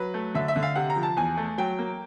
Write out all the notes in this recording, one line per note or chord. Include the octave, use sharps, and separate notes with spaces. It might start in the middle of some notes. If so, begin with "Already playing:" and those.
Already playing: F#3 B4
A3
D3 E5
E5
D3
F5
C3 F#5
A#5
F3
A5
E2 G#5
A3
F#3 G5
A#3